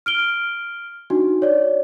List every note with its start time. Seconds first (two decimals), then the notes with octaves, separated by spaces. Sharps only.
0.06 F6 D7 G7
1.10 D4 D#4 F#4
1.42 C#5 D5